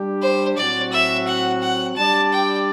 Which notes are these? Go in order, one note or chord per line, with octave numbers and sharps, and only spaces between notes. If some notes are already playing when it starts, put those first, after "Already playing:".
Already playing: G3 D4 G4
C5
A2 F#3 C4 F#4 D5
E5
F#5
F#5
G3 D4 G4 D5 A5
G5